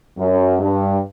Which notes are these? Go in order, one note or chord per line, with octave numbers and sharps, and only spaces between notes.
F#2
G2